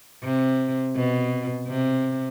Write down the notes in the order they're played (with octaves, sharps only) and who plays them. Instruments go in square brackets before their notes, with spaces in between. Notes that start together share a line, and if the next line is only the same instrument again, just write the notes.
[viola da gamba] C3
B2
C3